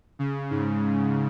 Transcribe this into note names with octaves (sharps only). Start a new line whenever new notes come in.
C#3
G#2